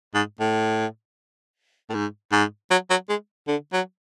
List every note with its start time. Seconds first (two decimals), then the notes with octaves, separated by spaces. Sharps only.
0.15 G#2
0.40 A2
1.90 A2
1.94 G#2
2.32 G#2
2.71 F#3
2.90 F#3
3.09 G#3
3.48 D3
3.73 F#3